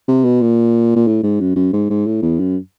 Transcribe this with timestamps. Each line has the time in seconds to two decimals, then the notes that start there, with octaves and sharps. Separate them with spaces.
0.08 C3
0.25 B2
0.42 A#2
0.96 A#2
1.07 A2
1.23 G#2
1.41 F#2
1.56 F#2
1.73 G#2
1.90 G#2
2.07 A2
2.22 E2
2.40 F#2